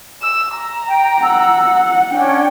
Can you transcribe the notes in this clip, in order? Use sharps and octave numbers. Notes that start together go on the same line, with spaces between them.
E6
A#5
G5
F#5 E6
C#4 D4 G5